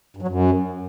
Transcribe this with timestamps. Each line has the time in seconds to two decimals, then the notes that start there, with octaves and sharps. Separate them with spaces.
0.17 G2
0.22 F#3
0.28 F#2